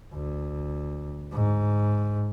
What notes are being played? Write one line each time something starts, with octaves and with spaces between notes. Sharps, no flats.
D2
G#2